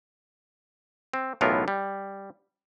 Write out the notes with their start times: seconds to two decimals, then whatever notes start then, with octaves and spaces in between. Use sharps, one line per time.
1.14 C4
1.41 B1 A2 E3 B3 F4 A#4
1.68 G3